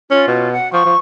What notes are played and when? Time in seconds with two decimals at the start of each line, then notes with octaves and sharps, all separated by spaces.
0.11 C#4 F4
0.28 B2
0.53 F#5
0.73 F3 C#6
0.85 F3